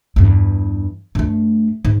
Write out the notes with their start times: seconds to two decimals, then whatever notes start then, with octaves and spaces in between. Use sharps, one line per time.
0.16 E2 G2
1.15 G2 A3
1.85 G#2